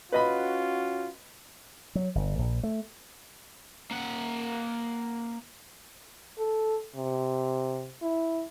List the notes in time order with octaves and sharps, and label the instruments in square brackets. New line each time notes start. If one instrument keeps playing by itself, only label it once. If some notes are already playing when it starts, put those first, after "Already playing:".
[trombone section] C#4 F4 F#4 [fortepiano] B4 D#5 B5
[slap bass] F#3
G1
A#1
A3
[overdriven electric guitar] A#3 F#5
[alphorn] A4
C3
E4